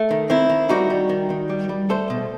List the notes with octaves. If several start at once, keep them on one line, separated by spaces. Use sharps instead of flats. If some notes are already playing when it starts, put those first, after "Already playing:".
Already playing: A3
D#3
D#3 C4 E4
D#3
G3 D#4 F#4
G3
D#3
D#3
G3
G3
A3 A4 C5
B2